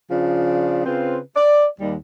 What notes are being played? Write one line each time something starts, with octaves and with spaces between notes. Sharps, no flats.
C#3 F3 D4 F4
C#3 C4 F4 B4 C5
D5
D#2 D#3 G3